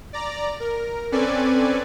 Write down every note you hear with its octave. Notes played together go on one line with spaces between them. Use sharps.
D5 A#5
A#4
C4 C#4 A4 B4 D5 G#5